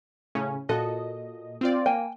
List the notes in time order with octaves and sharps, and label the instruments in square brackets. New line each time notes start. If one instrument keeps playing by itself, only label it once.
[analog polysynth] A2 C#3 C#4
[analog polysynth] A#2 D#5 [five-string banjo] F#4 A4
[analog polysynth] C4 F4 D5
[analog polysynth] A#3 [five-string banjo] G5 G#5